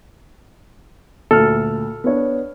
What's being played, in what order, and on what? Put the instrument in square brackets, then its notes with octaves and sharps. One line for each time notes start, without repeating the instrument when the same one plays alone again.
[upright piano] D2 A#2 F6 [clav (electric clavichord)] A4
[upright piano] B3 D4 C#5